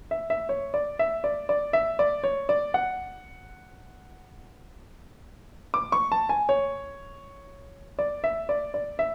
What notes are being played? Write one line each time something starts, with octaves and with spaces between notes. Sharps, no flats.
E5
E5
C#5
D5
E5
D5
D5
E5
D5
C#5
D5
F#5
D6
C#6
A5
G#5
C#5
D5
E5
D5
D5
E5